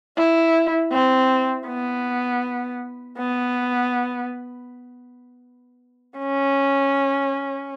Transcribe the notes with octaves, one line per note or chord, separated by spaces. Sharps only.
E4
C4
B3
B3
C#4